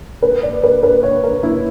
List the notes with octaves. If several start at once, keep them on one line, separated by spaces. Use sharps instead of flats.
B4
D5
B4
B4
C#5
A#4
E4